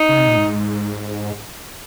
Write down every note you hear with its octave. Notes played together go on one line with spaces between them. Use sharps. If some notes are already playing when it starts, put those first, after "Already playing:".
Already playing: D#4
C#3
C3
A#2
G#2